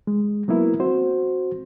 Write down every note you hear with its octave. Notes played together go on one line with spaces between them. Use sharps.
G#3
F#3 A#3 B3 E4 A#4
C4 F#4 C5